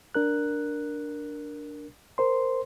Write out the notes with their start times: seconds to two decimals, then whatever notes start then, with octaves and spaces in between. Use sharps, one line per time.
0.15 D4 A#4 F#6
2.18 A#4 C5 C6